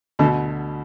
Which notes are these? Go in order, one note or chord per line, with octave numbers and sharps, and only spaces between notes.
D2 B2 D3